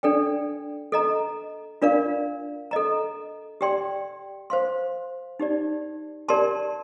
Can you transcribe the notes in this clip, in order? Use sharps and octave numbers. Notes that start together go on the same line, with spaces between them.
D4 A4 D5 G5
A4 D#5 A#5
D4 F4 A#4 D5 F5
A4 D#5 A#5
G4 D5 G5 C6
C5 F5 C6
D#4 G4 D5
G4 A#4 D5 A5 C6